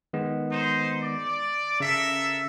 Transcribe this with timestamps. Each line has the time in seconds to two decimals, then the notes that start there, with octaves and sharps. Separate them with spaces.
0.13 D#3 G#3 B3
0.52 D#4 C5
1.02 D5
1.80 C#3 A4 A#4 E5 B6